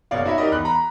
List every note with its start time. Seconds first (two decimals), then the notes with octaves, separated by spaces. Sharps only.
0.11 F#1 B2 C#5 D5 F5
0.25 D#4 F#4 C#5 E5 B5
0.38 D#4 G4 A#4 D5 D#5
0.52 E2 B5 F#6
0.65 A#5 B5